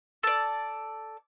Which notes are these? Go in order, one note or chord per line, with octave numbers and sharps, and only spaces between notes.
A4 D5